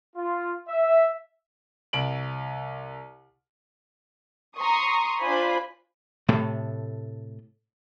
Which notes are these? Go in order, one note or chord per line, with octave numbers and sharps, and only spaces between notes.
F4
E5
C2 D7 F#7
A#5 C6 C#6 D#6
D4 F4 C5 G#5 B5
A2 C3 A3